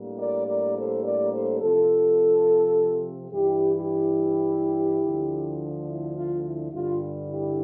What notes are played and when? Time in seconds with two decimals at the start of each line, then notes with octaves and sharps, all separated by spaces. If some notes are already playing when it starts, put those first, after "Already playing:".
Already playing: A2 G3 A#3 D4
0.19 A#4 D5
0.47 A#4 D5
0.76 A4 C5
1.04 A#4 D5
1.32 A4 C5
1.61 C3 F3 C4 F4 A4
3.31 G2 E3 G3 E4 G4
3.74 E4 G4
5.02 D2 D3 F3
5.87 E4
6.15 F4
6.44 E4
6.72 G2 D3 G3 F4
7.29 E4 G4